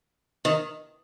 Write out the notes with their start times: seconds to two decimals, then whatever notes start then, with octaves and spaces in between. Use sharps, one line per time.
0.45 D#3